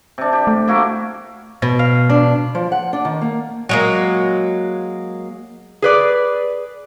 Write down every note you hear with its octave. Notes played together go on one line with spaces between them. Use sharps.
C3 D4
G4
A3
A#3 E4 F#4
B2
F5
D4
F3
F#5
D4
D#3
A#3
F#3 G#3 A#3
G#4 B4 D5